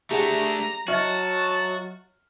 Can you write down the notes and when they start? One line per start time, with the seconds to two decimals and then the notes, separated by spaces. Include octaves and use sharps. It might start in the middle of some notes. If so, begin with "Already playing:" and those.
0.11 A3 D4 G4 G#4 F#5 A#5
0.88 F#3 F#4 D#5 E5 A5 F6